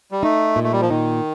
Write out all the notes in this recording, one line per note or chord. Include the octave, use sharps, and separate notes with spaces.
G3
A3 D#4
A#2
A3
G3
F3
D#3 D#4